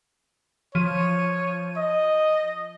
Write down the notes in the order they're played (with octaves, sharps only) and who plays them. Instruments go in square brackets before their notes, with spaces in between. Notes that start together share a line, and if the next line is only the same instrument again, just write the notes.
[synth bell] F3 D#7 [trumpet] C#5
[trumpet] D#5